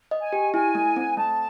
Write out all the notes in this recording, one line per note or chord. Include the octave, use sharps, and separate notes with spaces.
D#5
G#5
G4
E4 G#5
A3
C4
A3 A5